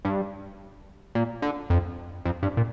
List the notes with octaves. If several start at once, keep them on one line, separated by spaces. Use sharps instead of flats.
G2
A#2
D3
F2
F2
G2
A#2